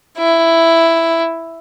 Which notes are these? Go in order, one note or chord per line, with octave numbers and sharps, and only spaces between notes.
E4